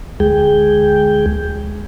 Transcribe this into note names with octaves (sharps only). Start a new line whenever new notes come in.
D2 G#3 G#4 G5